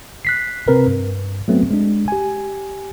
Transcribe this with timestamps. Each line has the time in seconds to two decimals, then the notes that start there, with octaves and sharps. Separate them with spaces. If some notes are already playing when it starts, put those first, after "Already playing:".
0.25 F#6 B6 C7
0.68 C3 C4 A#4 B4
0.86 G2
1.48 F#3 A3 B3 C4
1.71 G#3 D4
2.08 G4 G#5